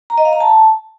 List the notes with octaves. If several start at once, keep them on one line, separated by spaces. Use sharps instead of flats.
A#5
D#5
F5
A#5
A5